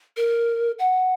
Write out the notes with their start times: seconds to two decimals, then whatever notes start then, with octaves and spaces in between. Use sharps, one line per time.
0.17 A#4
0.79 F#5